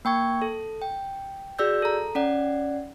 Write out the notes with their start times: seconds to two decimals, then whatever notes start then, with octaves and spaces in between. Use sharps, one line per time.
0.05 A#3 G5 C#6 G#6
0.42 A4
0.82 G5
1.59 F#4 G#4 D5 E6 G6
1.82 A4 A#5
2.15 C#4 D5 F#5